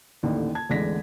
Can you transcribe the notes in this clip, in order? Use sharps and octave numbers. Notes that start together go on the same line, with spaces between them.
D#1 A1 D#2 A2 D3 D#3
A5 G#6
A1 E2 D3 G#3 A#6 B6